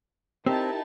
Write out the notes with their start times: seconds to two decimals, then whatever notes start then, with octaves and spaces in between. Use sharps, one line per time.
0.46 C4 D#4 E4 G4 A#4 A5